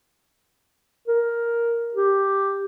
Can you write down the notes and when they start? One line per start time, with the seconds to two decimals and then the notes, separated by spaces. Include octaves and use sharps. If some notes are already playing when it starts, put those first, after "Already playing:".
1.08 A#4
1.94 G4